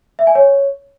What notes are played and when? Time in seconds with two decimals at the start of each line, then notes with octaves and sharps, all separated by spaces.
0.19 E5
0.27 G#5
0.35 C#5